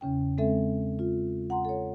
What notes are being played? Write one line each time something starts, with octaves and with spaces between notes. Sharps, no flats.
E2 C#3 C#4 G5
G#3 C4 A4 E5
F4
F#5 A#5 C6
A4 C#5